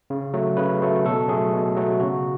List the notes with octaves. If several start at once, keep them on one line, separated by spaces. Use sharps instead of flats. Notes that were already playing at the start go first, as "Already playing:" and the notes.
C#3
F#3 A3
C#3 B4
F#3 A3
B2 A4
F#3 A3 G#4
B2
F#3 A3
C#3 F#4